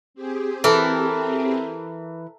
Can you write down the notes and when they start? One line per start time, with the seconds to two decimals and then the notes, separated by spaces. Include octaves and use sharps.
0.14 C4 G4 G#4
0.64 E3 A4 A#4